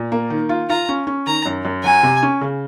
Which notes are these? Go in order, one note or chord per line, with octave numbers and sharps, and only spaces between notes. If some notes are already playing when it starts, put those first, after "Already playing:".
Already playing: A#2
A#3
D#3
F4
F4 A#5
C#4
C#4
D#3 A#5
F#2
F#2
F#3 G#5
C3
C#4
C#3